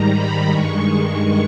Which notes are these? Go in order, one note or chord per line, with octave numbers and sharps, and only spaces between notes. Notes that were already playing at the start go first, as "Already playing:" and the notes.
Already playing: G#2 D#3 G3 A#5
B5
G2 D#3 G#3 C#6